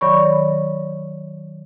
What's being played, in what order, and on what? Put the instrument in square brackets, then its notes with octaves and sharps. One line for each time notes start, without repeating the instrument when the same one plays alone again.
[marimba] D#3 F#3 C#5 D5 B5 C#6